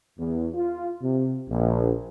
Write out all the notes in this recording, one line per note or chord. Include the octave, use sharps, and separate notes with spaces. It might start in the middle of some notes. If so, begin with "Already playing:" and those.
E2
F4
C3
A#1